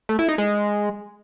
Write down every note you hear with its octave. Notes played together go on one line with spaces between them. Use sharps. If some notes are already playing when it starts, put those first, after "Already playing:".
A3
E4
D#4
G#3